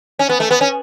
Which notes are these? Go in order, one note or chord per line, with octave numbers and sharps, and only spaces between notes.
C#4
B3
A3
B3
C#4